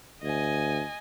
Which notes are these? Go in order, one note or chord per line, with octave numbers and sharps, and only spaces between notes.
D2 D#5 G#5